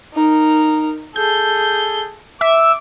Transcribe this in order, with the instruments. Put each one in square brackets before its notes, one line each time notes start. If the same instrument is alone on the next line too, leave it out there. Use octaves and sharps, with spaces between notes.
[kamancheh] D#4 A#4
[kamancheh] G#4 A4 [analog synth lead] G6
[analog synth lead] E5 [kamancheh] D6